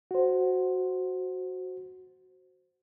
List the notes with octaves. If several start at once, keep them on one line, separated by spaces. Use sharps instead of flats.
F#4 C5